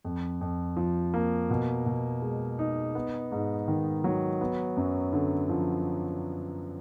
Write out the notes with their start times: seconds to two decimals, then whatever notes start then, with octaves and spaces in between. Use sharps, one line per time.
0.05 F2
0.41 F2
0.76 F3
1.14 A#3
1.50 B2
1.86 B2
2.22 G#3
2.59 D#4
2.95 B3
3.32 G#2
3.68 D#3
4.04 F#3
4.41 B3
4.77 F#2
5.13 D3
5.50 F3